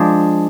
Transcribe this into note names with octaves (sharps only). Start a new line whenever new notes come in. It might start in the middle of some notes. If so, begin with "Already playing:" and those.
Already playing: F3 G#3 D4